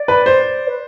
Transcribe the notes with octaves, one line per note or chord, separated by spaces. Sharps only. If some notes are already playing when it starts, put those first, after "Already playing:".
Already playing: D5
B4
C5
B4